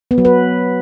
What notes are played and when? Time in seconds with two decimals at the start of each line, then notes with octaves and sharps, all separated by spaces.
0.11 B3
0.18 F#3
0.25 B4